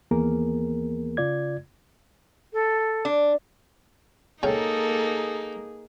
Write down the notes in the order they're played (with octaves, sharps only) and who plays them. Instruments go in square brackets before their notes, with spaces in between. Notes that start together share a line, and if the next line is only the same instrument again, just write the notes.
[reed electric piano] D#2 E3 A#3 B3 G#4 A#4
C#3 F4 D5 G#6
[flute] A4
[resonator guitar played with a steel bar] D4
[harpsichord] C#3 C#4 G5 [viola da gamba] A#3 D#4 [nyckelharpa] G#4 [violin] A4